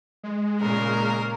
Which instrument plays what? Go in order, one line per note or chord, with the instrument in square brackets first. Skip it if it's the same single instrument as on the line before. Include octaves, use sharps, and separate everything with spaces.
[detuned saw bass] G#3
[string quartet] A#2 C#3 A#3 [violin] A#4